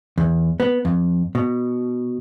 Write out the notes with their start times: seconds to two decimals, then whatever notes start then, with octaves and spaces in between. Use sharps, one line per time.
0.18 E2
0.60 B3
0.85 F2
1.35 B2